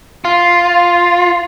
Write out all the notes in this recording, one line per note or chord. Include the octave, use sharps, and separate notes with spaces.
F4